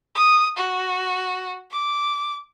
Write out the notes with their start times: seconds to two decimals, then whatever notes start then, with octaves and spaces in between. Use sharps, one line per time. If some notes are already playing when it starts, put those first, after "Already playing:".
0.15 D#6
0.57 F#4
1.71 D6